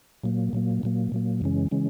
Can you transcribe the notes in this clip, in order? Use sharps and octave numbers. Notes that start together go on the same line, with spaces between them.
A#2 F#3 A#3
A#2 F#3 A#3
A#2 F#3 A#3
A#2 F#3 A#3
F#2 C#3 E3 G#3 C#4
C#3 E3 G#3 C#4